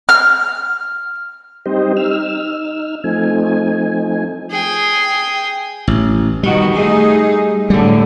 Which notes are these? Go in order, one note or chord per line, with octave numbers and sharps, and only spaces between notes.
F6
G3 C4 D#4 G4 C5 D#5
D#4 E6 F6
F3 A3 C4 D#4 G#5
G#4 G5
A1
B2 D#3 G3 F#4
A3 D#4 G#4
A2 D3 G3 A3